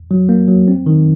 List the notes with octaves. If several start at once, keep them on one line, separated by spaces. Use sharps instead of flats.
F#3
A#3
F#3
C4
D#3